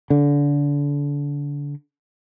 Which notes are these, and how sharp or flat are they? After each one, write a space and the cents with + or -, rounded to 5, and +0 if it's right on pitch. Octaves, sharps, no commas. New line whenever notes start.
D3 -30